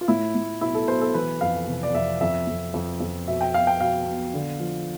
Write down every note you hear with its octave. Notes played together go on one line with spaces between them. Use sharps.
F4
A2 E4
A2
B1 E4
A4
B1 C5
A4
E3 B4
F2 F5
C3
D5
F2 E5
F2 E5
F2
F2
F2
B2 E5
G5
B2 F5
G5
B2 F5
B1
D3
F3